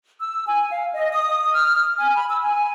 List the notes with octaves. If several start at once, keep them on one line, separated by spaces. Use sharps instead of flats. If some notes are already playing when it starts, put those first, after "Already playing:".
E6
G#5
F5
D#5
D#6
F6
G#5
B5
E6
G#5